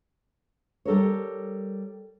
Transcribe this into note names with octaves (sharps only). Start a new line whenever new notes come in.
G3 A4 A#4 C#5